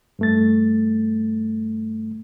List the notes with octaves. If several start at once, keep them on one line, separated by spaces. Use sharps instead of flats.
G2 A3 A6